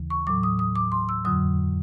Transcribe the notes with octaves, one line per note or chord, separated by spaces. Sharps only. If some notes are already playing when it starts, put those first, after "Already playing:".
Already playing: D#2 C#3 E3
C#6
A2 F#3 D6
D#6
D#6
D6
C6
E6
F2 D3 F#3 D#6